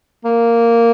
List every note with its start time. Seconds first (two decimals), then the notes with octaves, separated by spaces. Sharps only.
0.25 A#3